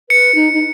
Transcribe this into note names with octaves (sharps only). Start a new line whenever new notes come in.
B4 C#7
D#4
D#4